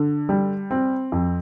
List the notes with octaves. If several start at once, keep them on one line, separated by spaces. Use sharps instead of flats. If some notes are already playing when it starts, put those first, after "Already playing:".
Already playing: D3
G3
C4
F2